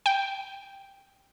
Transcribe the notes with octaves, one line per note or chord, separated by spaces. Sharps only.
G5